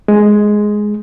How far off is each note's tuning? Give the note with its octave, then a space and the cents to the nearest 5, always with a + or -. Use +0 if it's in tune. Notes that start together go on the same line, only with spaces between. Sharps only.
G#3 +5